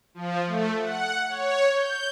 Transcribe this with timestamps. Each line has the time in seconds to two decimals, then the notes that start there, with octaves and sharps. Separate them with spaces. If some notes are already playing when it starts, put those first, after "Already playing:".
0.14 F3
0.47 A3
0.81 F#5
1.29 C#5
1.73 G6